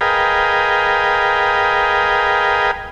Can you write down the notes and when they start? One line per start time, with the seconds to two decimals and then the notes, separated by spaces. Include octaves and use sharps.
0.01 G#4 A#4 B4 D#5 F5 G5